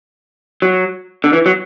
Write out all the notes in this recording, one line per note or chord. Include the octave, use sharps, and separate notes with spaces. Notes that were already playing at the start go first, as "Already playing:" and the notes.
F#3
D3
E3
F#3